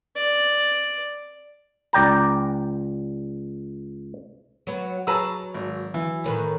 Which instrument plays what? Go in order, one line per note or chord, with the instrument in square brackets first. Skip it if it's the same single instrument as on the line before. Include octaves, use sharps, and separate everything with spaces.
[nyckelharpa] D5
[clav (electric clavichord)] C#2 D5 G5 A#5
[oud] F#3 B3
[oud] F#3 G#4 B4 [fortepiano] A5 A#5 E6
[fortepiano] G#1
E3
[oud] A2 D#3 B4